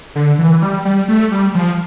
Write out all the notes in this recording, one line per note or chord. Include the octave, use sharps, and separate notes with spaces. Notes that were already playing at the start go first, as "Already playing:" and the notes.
D3
E3
G3
G3
A3
G3
F3